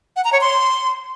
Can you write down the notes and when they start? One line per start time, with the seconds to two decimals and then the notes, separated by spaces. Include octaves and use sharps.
0.16 F#5
0.24 A#5
0.33 C#5
0.41 C6